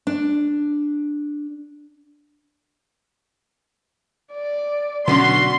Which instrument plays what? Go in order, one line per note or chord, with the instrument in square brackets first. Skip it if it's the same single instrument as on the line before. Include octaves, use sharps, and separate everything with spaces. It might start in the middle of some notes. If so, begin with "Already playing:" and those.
[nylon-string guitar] D4
[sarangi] D5
[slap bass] B2 D3 F#3 [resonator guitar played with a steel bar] B3 C#4 D4 [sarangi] F#4 [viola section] C6